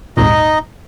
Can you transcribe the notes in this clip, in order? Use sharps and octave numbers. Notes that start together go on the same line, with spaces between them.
G#1 D#2 A#2 D#4 D#5